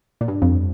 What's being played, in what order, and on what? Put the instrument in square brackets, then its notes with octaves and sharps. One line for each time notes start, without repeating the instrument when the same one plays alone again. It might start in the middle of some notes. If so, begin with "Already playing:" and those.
[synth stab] A#2
G2
F2